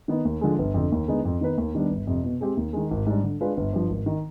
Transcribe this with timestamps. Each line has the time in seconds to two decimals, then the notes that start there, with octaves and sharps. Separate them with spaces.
0.08 D#3 B3 D#4
0.25 D#2
0.41 D3 F3 G#3
0.59 G1
0.74 F2 D3
0.92 D#2
1.08 D3 G#3 B3 D#4
1.25 F2
1.41 D#3 B3 D#4 B4
1.58 D#2
1.75 D#3 G3 B3 D4
1.91 G1
2.07 F2 C3
2.24 B2
2.41 G#3 C4 G4
2.57 D#2
2.73 D#3 G#3
2.91 G#1
3.07 G#2 G3 D4
3.24 D3
3.41 G#3 D4 F4 B4
3.57 G1
3.73 G2 F3
3.90 G#1
4.06 D#3